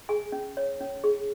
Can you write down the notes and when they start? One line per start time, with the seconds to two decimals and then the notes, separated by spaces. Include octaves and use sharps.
0.09 G#4 G#5
0.32 C#4
0.57 C#5
0.81 C#4
1.04 G#4